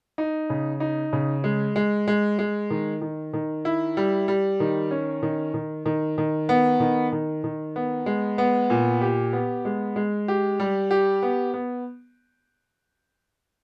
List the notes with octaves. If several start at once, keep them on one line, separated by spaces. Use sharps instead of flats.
D#4
C#3
D#4
C#3
G#3
G#3
G#3
G#3
D#3
D#3
D#3
E4
G3
G3
D#3
C#4
D#3
D#3
D#3
D#3
B3
D#3
D#3
D#3
B3
G#3
B3
A#2
G4
B3
G#3
G#3
G4
G3
G4
B3
B3